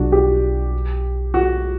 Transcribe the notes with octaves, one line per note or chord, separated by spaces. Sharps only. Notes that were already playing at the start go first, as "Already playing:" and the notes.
Already playing: B1 B2 F#3 D4 F#4
G4
F#4